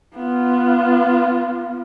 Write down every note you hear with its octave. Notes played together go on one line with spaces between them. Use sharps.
B3 F4